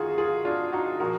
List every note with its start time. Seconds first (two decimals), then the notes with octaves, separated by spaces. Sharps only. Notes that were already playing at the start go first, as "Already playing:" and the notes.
Already playing: G#1 F#2 D#4 F4 F#4 G#4
0.18 F4 G#4
0.45 D4 F4
0.72 D#4 F#4
1.00 A#2 F3 F#4 A#4